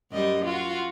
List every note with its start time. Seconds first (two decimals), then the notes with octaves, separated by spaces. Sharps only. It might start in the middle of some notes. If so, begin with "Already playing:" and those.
0.12 F#2 G3 D#5
0.45 F4 F#4